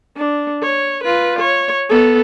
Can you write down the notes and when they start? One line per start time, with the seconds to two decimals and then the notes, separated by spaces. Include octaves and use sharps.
0.17 D4
0.63 C#5
1.04 F4 B4
1.39 C#5
1.90 B3 A4